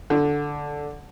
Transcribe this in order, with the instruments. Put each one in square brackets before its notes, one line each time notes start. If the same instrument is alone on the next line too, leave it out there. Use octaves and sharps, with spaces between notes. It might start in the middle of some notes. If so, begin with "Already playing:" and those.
[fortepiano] D3